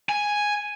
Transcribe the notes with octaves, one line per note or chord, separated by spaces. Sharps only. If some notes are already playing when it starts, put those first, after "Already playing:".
G#5